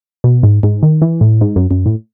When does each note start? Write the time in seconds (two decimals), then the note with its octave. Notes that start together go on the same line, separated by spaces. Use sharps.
0.24 B2
0.43 G#2
0.63 G#2
0.83 D#3
1.02 E3
1.21 A2
1.41 G#2
1.56 F#2
1.71 F#2
1.86 A2